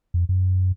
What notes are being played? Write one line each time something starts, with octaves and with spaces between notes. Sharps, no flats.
F2
F#2